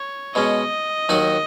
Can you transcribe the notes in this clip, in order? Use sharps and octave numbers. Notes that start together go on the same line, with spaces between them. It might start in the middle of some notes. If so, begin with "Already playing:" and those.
Already playing: C#5
B2 G#3 C#4 D#5
D#2 D#3 F#3 D#4 F#4